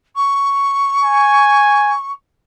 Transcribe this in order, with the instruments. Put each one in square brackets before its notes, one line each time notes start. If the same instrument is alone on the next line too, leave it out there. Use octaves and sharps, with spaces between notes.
[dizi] C#6
[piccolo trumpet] G#5